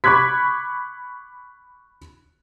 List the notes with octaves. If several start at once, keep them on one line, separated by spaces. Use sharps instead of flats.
B5 C#6 D6 F#6 G#6 B6